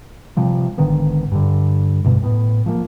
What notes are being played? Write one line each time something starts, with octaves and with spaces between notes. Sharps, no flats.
C3 F3 G3
G#1 D3 D#3 B3
G2 D3
D2 G2 B2
A2 B3
F3 G#3 A#3